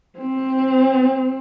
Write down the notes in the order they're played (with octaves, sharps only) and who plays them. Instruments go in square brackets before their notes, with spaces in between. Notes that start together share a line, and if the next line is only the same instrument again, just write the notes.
[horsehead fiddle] C4